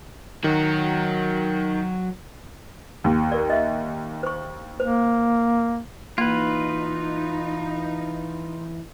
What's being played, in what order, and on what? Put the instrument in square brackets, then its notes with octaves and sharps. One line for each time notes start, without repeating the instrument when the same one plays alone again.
[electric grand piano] D#3 [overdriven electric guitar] F#3 F#4
[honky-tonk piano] D#2
[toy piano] A#4 D5
D#5 E5
C5 C#6
[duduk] A#3 [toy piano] C5
[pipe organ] E3 [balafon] A#3 [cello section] D#4 [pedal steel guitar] F4 B4